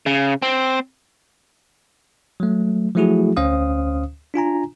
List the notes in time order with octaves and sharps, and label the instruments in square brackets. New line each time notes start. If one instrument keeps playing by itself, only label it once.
[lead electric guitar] C#3
C4
[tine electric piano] F#3 A3
F3 F#3 A3 E4 F#4 G#4
D2 C#4 C5 F5 D#6
D4 F4 G#5 A#5